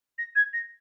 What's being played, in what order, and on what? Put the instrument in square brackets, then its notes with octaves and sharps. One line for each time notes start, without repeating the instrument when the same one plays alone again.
[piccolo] A#6
G#6
A#6